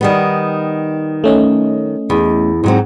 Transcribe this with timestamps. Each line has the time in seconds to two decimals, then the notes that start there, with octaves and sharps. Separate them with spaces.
0.01 D#3 G3 B3
1.24 A3 C#4 D#5
2.10 E2
2.64 G#2 F#3 C4